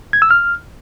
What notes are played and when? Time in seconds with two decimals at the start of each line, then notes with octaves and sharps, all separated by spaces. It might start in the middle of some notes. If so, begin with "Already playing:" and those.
0.13 G#6
0.22 E6
0.31 F6